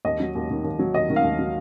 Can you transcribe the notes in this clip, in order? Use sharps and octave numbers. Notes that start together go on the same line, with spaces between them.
D#2 D#5
F#3
D#2
D#3
D#2
F#3
D#2 D#5
D#3
F5
D#2
F#3